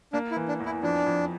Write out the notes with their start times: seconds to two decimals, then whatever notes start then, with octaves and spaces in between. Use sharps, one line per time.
0.13 A#3 D4
0.31 E4
0.36 E3
0.48 D4
0.60 E2
0.65 E4
0.83 F2 D4
1.06 F2